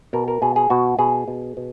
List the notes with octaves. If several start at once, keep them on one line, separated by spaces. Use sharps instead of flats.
B2 A#4
A#4
B2 G#4
G#4
B2 F#4
B2 G#4
B2
B2